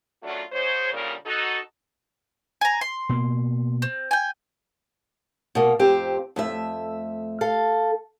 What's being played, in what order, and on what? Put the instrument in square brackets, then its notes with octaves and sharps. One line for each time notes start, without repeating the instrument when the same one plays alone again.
[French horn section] F#2 F#3 A3 D4 F4 F#4
G#2 C5 C#5
D2 A#2 C#3 G3 A#3 A#4
D#4 F#4 A4
[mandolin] G#5 A#5
C6
[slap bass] B2 A#3
[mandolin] C4
G5 G#5
[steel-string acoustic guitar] B2 A#3
F2 C4 G4 C5
F2 A3 E5
A4 F5